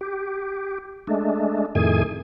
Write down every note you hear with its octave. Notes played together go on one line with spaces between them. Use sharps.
G4
G#3 A3 D4
F2 A2 D#3 A3 G#4 G#5